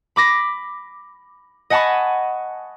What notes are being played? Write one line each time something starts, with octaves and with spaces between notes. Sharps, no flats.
B5 D6 A#6 B6
D#5 F#5 G#5 A5 B5 C#6